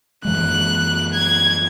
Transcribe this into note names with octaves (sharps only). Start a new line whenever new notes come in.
F#2 E3 G#3 F#6
G#6